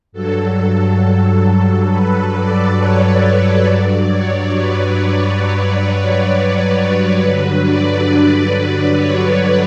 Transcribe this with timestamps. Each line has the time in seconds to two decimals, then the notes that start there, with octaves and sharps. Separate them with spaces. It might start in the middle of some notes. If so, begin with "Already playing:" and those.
0.12 G2 F#3 A4
1.89 B4
2.33 D5
2.77 C#5
3.65 G2 F#3 D5
4.10 C#5
4.53 B4
4.98 C#5
6.31 D5
6.74 D5
7.18 G2 D3 F#3 B4
7.63 D5
8.51 D5
8.96 C#5